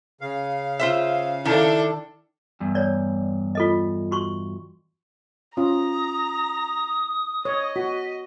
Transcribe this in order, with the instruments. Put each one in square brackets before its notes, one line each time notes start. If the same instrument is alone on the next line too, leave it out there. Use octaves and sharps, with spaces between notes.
[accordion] C#3 F5
[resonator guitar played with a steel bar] F4 C5 E5
[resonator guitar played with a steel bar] D#3 [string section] D4 A4 [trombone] E4
[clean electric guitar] E2 G2
[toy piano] C#5 D5
F4 A4 D#5
F#4 C6 C#6
[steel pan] C#4 F4 [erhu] A#5 [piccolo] D#6
[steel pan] C#5 [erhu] D#5
[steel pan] F#4 [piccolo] B6